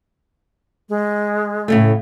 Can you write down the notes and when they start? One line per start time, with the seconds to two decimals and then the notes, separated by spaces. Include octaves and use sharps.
0.89 G#3
1.68 A2 C#3 A3